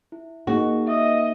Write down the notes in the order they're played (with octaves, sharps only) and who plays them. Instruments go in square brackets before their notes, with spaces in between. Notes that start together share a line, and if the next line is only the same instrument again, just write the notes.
[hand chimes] E4
[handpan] A#3 D#4 [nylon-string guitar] F#4 [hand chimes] G#4
[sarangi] D#5 [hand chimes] E5 D#6